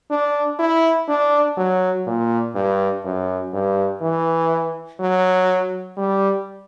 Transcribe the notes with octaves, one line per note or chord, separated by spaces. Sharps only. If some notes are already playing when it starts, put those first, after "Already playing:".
D4
E4
D4
F#3
A#2
G2
F#2
G2
E3
F#3
G3